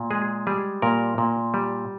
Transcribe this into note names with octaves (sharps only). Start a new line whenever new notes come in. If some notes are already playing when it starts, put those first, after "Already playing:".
Already playing: A#2
G#3 G#4
G3 G#4
A#2 A#4
A#2
G3